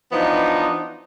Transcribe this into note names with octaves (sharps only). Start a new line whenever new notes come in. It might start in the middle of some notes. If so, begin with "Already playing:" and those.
E3 F3 B3 D4 D#4